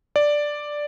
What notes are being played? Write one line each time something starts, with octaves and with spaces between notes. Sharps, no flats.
D5